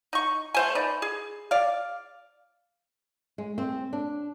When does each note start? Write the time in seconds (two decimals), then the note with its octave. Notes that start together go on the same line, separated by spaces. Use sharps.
0.13 D#4 C#6
0.54 A3 C5 G#5
0.75 D#4 B4 D5
1.02 G#4
1.51 D5 F5
3.38 G#3
3.58 C4
3.93 D4